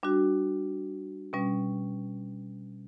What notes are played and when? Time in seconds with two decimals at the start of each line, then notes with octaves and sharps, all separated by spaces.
0.03 G3 D4 F#4
1.33 B2 G3 C#4